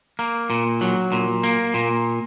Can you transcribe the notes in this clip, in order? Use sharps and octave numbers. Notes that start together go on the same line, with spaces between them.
A#3
A#2
F#3
A#2
A#3
A#2